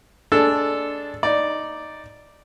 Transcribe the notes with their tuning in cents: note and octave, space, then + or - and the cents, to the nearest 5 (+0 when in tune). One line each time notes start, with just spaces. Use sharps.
G#3 +0 D4 -15 A4 +0
D#4 +0 D5 +0